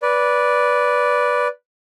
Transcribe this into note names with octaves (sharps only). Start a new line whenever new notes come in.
B4 D5